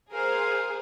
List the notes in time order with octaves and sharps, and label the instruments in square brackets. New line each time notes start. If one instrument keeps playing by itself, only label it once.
[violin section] G#4 C5 [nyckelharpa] A#4 F5